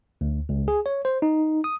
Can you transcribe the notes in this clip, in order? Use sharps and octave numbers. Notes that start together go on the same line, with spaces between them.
D2
C#2
G#4
C#5
C5
D#4
D#6